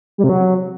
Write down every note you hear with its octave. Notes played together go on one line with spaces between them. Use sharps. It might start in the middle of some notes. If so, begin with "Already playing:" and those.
G3
C3
F#3